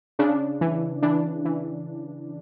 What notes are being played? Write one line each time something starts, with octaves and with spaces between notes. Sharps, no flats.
C#3 D4
E3
E3 D4
E3